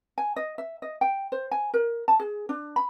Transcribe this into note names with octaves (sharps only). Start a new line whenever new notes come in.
G#5
D#5
E5
D#5
G5
C5
G#5
A#4
A5
G#4
D4
B5